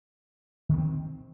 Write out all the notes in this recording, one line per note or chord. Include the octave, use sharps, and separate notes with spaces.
D#3 B3 C4